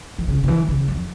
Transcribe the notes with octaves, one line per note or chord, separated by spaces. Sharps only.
E3
C#3
C#3
E3
C#3
F2